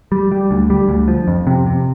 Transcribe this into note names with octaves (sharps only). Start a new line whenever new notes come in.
G3
G3
D2
G3
D2
F3
F2
C3
C3